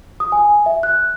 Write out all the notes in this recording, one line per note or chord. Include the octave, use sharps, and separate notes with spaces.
D#6
G#5
E5
F#6